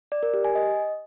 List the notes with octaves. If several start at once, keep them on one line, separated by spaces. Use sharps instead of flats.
D5
A#4
G4
G#5
D#5